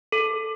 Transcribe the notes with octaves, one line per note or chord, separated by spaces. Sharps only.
A4